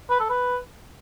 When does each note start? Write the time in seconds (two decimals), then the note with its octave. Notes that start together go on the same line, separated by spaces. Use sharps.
0.11 B4
0.20 A4
0.30 B4